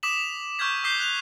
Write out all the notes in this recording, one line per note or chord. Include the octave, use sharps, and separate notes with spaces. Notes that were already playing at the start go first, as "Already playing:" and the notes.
D6 D#6 B6 E7 F#7
C#6 F6 G6 G#6 B6
D6 D#6 G6 B6 C7 G7
F#6 F7